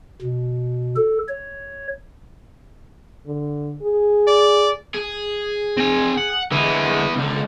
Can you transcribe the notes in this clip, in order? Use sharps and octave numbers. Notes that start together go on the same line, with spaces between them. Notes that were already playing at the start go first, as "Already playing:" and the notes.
B2
A4
C#5
D3
G#4
D5
G#4
C4 G#5
F#5
D3 G#3 B3 E4
C#2 D3